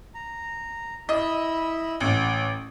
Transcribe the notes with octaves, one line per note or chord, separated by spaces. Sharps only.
A#5
E4 D#5 B5 E6
A1 F#5